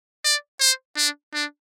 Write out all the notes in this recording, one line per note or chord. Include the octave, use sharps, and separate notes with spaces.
D5
C5
D4
D4